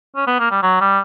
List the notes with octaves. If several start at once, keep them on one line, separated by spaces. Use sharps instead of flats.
C#4
B3
A#3
G3
F#3
G3